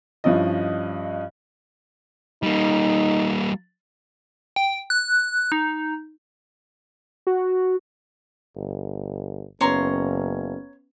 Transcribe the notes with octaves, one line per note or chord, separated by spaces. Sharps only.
G2 F3 C#4 E4 D#5
G3 A#3 D#4
G5
F#6
D#4
F#4
G1
F#1 B3 C#4 B4 C#5 A#5 C6